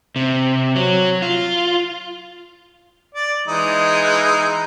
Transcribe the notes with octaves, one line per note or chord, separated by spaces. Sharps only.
C3
F#3
F4
D5
E3 G#3 D#4